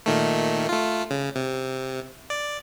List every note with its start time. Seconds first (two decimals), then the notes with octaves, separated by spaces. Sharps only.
0.06 A#2 D#3 A3
0.69 A3 F4
1.11 C#3
1.36 C3
2.30 D5